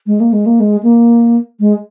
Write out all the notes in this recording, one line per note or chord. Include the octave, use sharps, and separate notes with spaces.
G#3
A#3
G#3
A#3
G#3
A#3
G#3